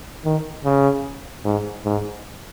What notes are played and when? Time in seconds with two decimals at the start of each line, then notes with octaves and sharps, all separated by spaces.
0.24 D#3
0.64 C#3
1.45 G#2
1.85 G#2